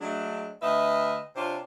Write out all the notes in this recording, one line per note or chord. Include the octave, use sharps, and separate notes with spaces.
F#3 G#3 A3 D4
D2 B4 D#5 E5
C3 D4 F4 C5 C#5